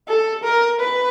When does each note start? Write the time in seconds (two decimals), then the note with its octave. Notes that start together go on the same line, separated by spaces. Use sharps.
0.08 A4
0.44 A#4
0.81 B4